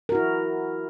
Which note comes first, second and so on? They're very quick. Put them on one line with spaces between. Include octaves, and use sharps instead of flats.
A#4 F#4 E4